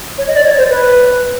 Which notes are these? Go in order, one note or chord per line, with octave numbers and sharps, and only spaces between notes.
C#5
D#5
D5
C#5
C5
B4